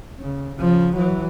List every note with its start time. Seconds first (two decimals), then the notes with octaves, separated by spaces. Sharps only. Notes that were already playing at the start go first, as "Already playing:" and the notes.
0.20 C#3
0.56 C#3 F3
0.97 E3 F#3